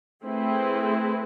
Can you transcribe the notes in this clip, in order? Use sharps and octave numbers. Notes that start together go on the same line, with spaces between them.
A3 C4 E4 G#4 B4